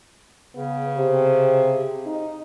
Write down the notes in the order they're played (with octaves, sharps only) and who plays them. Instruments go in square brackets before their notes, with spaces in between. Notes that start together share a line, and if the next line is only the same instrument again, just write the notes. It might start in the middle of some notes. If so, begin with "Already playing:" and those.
[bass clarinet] C#3 [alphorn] B3
[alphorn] C3
D#4